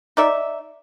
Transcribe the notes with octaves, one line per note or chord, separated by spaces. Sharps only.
D#4 D5 E5